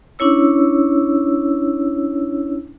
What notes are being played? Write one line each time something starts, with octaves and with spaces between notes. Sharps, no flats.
C#4 D4 E4 C#5 E6